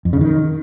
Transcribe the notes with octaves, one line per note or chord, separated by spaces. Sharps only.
F2
C#3
D#3